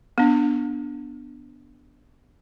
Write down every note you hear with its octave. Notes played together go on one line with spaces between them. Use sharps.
B3 D4